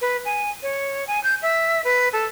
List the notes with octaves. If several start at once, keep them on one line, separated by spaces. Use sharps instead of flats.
B4
G#5
C#5
G#5
G6
E5
B4
A4